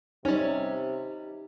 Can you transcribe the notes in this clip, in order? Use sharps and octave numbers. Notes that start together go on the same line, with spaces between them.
C3 G3 C#4 D#4